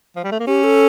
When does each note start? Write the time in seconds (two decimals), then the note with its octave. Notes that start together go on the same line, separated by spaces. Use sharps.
0.16 F3
0.24 G3
0.32 A3
0.40 A#3
0.47 C#4 G4
0.64 A4